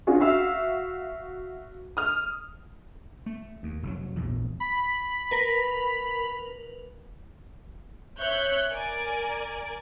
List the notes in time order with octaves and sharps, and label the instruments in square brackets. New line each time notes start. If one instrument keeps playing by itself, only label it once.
[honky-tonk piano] C#4 D4 F4 F#4 G#4
F#4 E5 F5 E6
D#6 F6
[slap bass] A3
D#2
F1 A2 F#3
A#1 E2
[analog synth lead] B5
[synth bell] A#4 B4
[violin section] C#5 E5 F#6 G6
A#4 D5 G#5